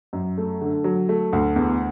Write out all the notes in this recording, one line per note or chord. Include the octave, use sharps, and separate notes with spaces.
F#2
A3
D3
F#3
A3
D2
E2